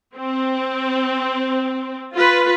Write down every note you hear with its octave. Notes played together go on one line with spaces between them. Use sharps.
C4
F4 B4